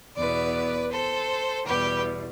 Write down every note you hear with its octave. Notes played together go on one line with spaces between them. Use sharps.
E2 B2 B3 B4 D5
A4 C5
E2 B2 G3 G4 B4